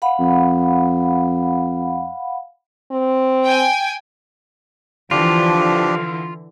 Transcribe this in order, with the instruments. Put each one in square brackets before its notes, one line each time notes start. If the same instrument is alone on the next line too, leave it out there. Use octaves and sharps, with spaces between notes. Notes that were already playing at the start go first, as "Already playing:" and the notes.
[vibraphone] F5 F#5 B5
[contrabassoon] F2
[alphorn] C4
[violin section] G5 G#5
[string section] D3 E3 [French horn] F3 [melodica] D4 G4 [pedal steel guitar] F4